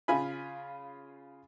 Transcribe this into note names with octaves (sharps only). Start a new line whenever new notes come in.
C#3 F4 G#5 B5